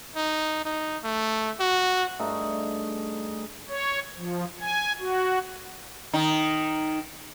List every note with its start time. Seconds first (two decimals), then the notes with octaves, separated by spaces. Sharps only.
0.16 D#4
0.65 D#4
1.04 A3
1.60 F#4
2.19 G2 A3 D#4 G#4
3.69 C#5
4.17 F3
4.60 G#5
5.00 F#4
6.13 D#3 D#4